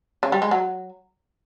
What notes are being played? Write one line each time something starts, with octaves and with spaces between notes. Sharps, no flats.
C#3
G3
G#3
F#3